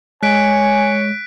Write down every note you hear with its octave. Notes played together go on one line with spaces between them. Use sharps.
G#3 C#5 G#5 F#6 B6 D7